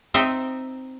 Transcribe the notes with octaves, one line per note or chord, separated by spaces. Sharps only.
C4 D#4 E5 G5